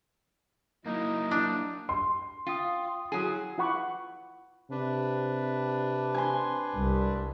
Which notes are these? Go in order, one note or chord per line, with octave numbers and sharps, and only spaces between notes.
F#3 A#3 D#4 E4
D4
C6
F4 F5 G5 D#6
F#3 E4 F#4 G#4
E4 F4 F#5 B5 C#6 D6
C3 D4 B4
G#5 C6
C2 G3